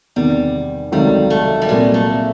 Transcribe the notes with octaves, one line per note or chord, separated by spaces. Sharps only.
E2 C3 D#3 G3
C#2 C3 D#3 F#3 G3 A3
A3
G3
C2 A#2 F#3 G#3 A#3
A3